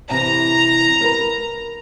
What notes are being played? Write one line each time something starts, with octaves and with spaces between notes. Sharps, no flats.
C3 E3 A#5
A#4 B4